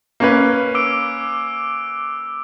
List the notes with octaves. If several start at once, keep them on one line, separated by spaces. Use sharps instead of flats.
A#3 C#4 B4
D6 E6 D7